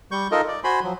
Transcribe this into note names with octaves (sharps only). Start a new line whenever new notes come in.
G3 C#6 G6
D#4 F4 A4 A#4 D#5
D5
F#4 C5 G#5 B5 C6
F3 F#3